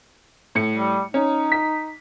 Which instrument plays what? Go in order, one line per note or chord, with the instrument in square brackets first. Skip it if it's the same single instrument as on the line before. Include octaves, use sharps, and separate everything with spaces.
[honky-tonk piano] A2 C#7
[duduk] G3
[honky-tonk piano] C#4 [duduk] D#4
[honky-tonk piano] B6